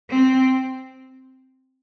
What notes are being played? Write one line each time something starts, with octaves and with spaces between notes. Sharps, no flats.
C4